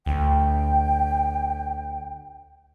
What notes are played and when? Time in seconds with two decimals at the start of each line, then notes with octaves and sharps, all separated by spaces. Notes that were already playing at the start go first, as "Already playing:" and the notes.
0.06 D2 G5